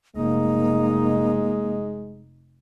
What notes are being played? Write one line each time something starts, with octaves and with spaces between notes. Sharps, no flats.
F1 G#3 A#3 D#4